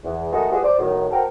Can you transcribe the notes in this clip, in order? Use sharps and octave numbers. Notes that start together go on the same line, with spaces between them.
E2
D#3 G#3 A3 D#4 F#4 A4
G3 G#3 B3 F4 F#4 G#4
C5 D5
A2 D#3 F#3
F#4 A4 A#4 C5 G5